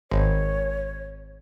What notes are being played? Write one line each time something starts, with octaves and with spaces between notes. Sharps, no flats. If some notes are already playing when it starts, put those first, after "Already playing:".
G#1 C#5